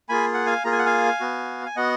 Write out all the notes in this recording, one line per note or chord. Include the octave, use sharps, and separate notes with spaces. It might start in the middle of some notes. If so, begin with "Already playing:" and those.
A#3 F4 G#4 G#5 B5
F#5
F5 G#5
A#3 F4 G#4 A#5
G#5
F#5
F5 G#5
B3 F#4
G#5
B3 F#4 D#5 F#5